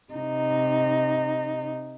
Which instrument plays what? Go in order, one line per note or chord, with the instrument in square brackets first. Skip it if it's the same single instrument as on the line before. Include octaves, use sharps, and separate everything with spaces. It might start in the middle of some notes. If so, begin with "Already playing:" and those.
[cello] C3 D#4